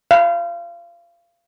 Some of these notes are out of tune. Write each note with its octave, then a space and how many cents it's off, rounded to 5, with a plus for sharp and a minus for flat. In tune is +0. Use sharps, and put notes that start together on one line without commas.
F5 -30